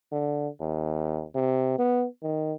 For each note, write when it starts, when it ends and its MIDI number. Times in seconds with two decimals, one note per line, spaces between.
0.12 0.48 50
0.60 1.24 39
1.35 1.78 48
1.79 2.06 59
2.22 2.54 51